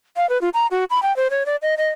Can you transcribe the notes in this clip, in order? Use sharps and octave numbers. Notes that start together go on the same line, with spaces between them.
F5
B4
F4
A#5
F#4
B5
G5
C5
C#5
D5
D#5
D#5